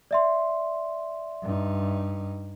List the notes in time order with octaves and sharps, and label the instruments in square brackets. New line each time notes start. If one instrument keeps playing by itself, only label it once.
[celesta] D5 E5 C6
[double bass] G2 D#4